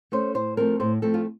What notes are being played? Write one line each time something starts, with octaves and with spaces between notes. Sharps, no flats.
A3 C#4 C5
A2 C5
F3 A3 C4 A#4
A2 C5
F3 A3 C4 A4
F4